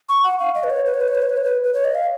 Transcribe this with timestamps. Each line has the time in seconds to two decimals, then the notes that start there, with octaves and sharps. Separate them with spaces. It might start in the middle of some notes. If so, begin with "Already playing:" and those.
0.09 C#6
0.24 F#5
0.39 F5
0.55 D#5
0.64 B4
0.70 C#5
0.86 B4
0.94 C#5
1.01 B4
1.08 C#5
1.15 B4
1.22 C#5
1.30 B4
1.37 C#5
1.44 B4
1.64 B4
1.74 C#5
1.85 D#5
1.95 F5